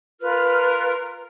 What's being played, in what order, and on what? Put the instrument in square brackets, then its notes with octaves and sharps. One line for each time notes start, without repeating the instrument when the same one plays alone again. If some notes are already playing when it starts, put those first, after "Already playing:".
[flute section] F4 A#4 F6 [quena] B4